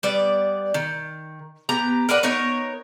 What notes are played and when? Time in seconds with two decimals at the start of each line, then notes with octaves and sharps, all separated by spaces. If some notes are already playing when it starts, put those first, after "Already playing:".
0.03 G3 B3 D5
0.74 D#3
1.69 B3 G4 A#5
2.09 A#4 B4 D5 F#5
2.23 B3 D#4 A#4 C#5